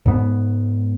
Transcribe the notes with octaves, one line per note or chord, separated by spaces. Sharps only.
G#2 B3